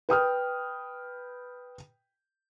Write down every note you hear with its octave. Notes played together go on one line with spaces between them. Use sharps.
B4 G5 D#6 F6